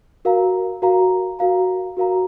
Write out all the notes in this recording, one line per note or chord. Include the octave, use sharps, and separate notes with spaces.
F#4 A#4 F5 A#5
F#4 A#4 F5 A#5
F#4 A#4 F5 A#5
F#4 A#4 F5 A#5